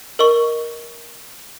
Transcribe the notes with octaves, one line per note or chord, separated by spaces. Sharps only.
A#4 D#5 C#6